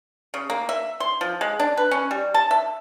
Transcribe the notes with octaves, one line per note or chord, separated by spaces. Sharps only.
C#3
A#3
E5
C6
F3
G#3
D4
B4
C#4
G3
A5
E5